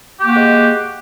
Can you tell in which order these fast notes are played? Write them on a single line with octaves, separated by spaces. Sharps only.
G4 A#3 F#4 G#3